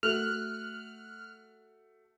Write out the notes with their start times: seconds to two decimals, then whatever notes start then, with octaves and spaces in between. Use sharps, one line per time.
0.03 A3 F#4 F6 F#6